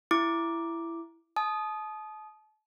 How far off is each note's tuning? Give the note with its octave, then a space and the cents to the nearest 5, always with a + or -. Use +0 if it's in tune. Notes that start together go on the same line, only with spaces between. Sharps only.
E4 +15 D6 +0
A5 -35 D#6 +0